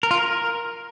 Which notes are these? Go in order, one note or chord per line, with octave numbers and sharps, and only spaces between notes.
A#4
F4
A#4